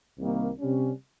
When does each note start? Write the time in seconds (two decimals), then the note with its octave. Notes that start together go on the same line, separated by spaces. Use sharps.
0.18 C2 C3 D#3 G3 A#3
0.59 C3 G3 C#4